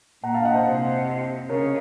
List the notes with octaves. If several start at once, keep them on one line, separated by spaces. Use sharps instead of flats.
A#2 F#5 A#5
F5 A5
D#5 F#5
C5 D#5
C3
C#3 A#4 C#5